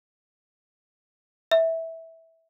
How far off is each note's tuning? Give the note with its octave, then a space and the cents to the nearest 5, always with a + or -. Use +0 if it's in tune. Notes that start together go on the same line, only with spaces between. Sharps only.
E5 -15